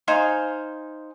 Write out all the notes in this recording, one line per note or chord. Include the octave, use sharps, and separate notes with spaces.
D#4 C5 F5 G#5